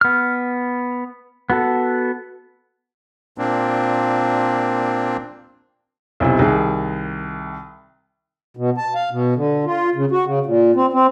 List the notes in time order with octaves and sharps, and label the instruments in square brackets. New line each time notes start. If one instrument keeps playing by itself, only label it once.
[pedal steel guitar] B3 F6
B3 F#4 A4
[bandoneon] A#2 A#3 C4 D4
[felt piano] B1 C3 E4
C2 D#3 G#4
[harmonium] B2
A5
F5
B2
D3
F4
C#3
F#4
C#3
A#2
C4
C4